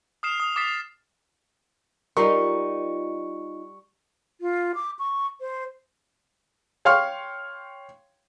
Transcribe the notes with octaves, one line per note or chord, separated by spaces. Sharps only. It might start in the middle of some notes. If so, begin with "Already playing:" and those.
D#6 F6 C7 E7
D#6
D6 D#6 A6 B6 C7 E7
G3 D#4 F4 A#4 C#6
F4
D6
C#6
C5
C#5 F5 G5 C6 C#6 F6